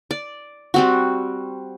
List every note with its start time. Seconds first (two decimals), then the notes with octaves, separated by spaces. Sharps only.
0.11 D5
0.74 G3 C4 F#4